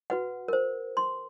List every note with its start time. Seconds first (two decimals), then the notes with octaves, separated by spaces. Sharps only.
0.10 F#4 B4 F#5
0.48 A#4 C5
0.97 C6